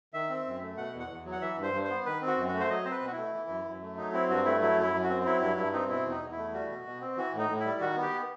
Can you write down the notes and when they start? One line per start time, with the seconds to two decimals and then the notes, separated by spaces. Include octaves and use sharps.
0.14 D#3 E5
0.30 C4
0.46 F#2
0.62 A3
0.77 B2 F#5
0.94 E2
1.00 F#5
1.10 E2
1.25 F#3
1.32 F#5
1.41 E3 E5
1.58 G2 C5
1.73 G2
1.84 C5
1.90 B3
2.06 D#3 B4
2.22 C4
2.27 F#4
2.37 F#2
2.48 F#4
2.54 A3
2.60 C5
2.70 F#3 D#5
2.85 C4 C5
2.91 B4
3.02 B2
3.07 F#4
3.12 E4
3.18 A3
3.33 E3
3.49 F#2
3.66 F#2
3.82 A3
3.97 F#3 D#4
4.13 C4 E4
4.30 G2 F#4
4.45 A3 E4
4.61 F#3 E4
4.78 F#2 E4
4.94 F#2
5.04 F#4
5.09 C4
5.25 F#3 E4
5.41 G2 E4
5.57 G2 E4
5.73 C4 D#4
5.89 B2 E4
6.06 E2 D#4
6.22 E2
6.32 E4
6.37 A3
6.53 G3 F#4
6.70 B2
6.86 B2
7.01 C4
7.17 E3 F#4
7.33 A2
7.39 D#4
7.49 A2
7.60 E4
7.65 G3
7.81 D#3 F#4
7.97 B3
8.02 G4